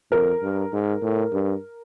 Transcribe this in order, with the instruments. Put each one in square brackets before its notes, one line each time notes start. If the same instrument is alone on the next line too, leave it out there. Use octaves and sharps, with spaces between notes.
[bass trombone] F2 [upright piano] A#4
[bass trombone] G2
G#2
A2
G2